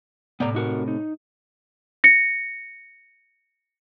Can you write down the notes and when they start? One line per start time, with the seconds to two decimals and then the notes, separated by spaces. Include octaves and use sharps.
0.40 A2 C3 B3 D5 A#5
0.55 D#4 F#4 A#4
0.88 D#4
2.04 A#6 C#7